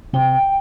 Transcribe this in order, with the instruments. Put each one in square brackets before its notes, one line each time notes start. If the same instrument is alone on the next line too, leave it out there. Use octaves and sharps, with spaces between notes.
[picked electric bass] C3 [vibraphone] G5